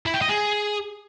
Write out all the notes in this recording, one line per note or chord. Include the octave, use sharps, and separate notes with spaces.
E4
G5
D#5
G#4